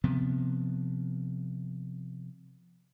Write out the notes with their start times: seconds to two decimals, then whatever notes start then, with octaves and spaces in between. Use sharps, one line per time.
0.04 C3 F3 B3